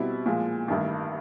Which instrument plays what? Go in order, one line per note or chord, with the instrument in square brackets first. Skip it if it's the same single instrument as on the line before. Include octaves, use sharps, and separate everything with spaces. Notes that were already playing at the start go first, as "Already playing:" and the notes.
Already playing: [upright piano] B2 G3 C4 E4
A#2 F3 G#3
A1 G2 D#3